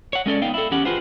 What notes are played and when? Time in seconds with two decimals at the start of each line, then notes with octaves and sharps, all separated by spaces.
0.13 C#5 F#5
0.26 G#3 C#4 A4 D5
0.42 B3 D#4 F5 G5
0.54 E4 A4
0.71 E2 C#4 G4 F#5
0.85 F4 G4 G#4 B4 C5 F#5